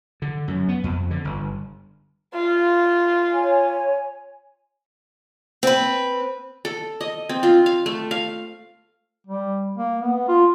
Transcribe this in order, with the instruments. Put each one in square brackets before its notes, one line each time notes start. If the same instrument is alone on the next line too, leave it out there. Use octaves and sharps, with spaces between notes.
[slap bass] D3
F#2
B3
F2
D3
G1
[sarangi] F4
[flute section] C#5 G#5
[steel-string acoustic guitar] C4 B4
[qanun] A4
D#5
C4
F4
F5
A3
F5
[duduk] G3
A#3
B3
F4